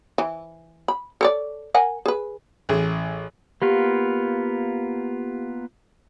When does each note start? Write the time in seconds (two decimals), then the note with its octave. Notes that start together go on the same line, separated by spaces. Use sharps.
0.18 E3
0.88 B5
1.21 A4 C#5 D5
1.74 A#4 F#5 G#5
2.06 G#4 B4
2.69 A1 G#4
3.62 A#3 B3 F4 G4